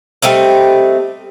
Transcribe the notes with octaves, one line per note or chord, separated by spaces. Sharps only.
G3 A3 C4 D#5